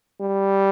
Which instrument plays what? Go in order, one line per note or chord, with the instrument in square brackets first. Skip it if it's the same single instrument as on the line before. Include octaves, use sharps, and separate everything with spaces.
[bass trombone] G3